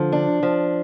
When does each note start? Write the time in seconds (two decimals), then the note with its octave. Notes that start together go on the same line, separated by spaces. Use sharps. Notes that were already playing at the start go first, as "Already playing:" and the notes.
Already playing: D3 F3
0.12 D4
0.43 F3